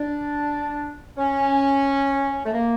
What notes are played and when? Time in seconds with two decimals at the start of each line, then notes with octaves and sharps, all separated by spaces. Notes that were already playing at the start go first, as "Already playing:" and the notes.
Already playing: D4
1.17 C#4
2.45 A3
2.53 A#3